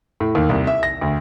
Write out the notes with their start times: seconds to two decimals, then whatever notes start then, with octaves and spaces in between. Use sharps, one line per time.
0.20 A2
0.35 D#2
0.49 C2
0.67 E5
0.83 A#6
1.01 D2